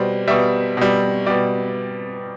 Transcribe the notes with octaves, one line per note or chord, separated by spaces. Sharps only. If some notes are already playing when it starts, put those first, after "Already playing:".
Already playing: B2 G3 C5
B2 G3 E5
B2 G3
B2 G3 D5